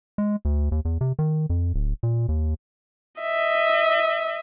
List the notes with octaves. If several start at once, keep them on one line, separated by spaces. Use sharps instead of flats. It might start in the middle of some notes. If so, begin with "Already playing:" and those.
G#3
D2
D#2
E2
C3
D#3
F2
D1
A#2
D#2
D#5 E5